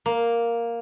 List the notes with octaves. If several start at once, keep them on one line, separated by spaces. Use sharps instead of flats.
A#3